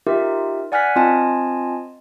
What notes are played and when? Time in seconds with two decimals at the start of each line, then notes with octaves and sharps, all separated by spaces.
0.07 D#4 F4 G4 A#4 E5
0.72 D5 F#5 G#5 F6 F#6 B6
0.96 C4 F4 D#5 G#5 A5